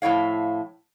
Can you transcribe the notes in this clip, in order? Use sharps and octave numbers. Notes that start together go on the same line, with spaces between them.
A2 F3 E4 C#5 F5